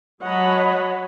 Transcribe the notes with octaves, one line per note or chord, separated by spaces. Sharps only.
F#3 C#5 D#5 F#5 A5 B5